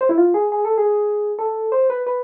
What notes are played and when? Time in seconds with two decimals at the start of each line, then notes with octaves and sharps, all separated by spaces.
0.01 C5
0.09 E4
0.18 F4
0.34 G#4
0.52 G#4
0.65 A4
0.78 G#4
1.39 A4
1.72 C5
1.90 B4
2.07 B4